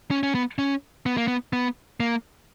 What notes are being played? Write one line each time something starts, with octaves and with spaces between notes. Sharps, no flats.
C#4
C#4
B3
C#4
B3
A#3
B3
B3
A#3